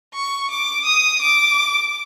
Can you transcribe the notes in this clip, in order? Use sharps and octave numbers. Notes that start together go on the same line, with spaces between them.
C#6
D6
D#6
D6